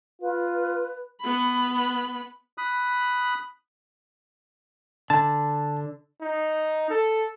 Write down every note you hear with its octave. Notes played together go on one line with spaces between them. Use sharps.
F4 B4
B3 B5
B5 D#6 F#6
D3 A5
D#4
A4